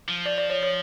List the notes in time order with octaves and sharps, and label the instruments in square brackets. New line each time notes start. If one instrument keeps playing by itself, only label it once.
[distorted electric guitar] F3
[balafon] D5
D5
C#5
C#5